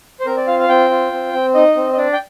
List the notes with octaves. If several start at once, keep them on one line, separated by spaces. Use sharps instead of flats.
C5
C4 A#4
D5
F4 F5
F5
C4 G5
F4
C4
C4
D#4 D#5
C4
D#5
D4 D5
G5